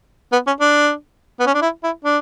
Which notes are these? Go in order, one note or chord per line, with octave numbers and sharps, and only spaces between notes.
B3
C#4
D4
B3
C#4
D4
E4
E4
D4